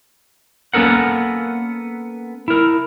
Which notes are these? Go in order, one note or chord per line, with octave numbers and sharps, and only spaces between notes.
A#3 B3 C#4 A4 A#4 F#5
E4 A#4